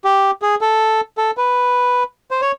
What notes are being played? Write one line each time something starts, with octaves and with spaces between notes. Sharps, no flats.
G4
G#4
A4
A4
B4
C5
C#5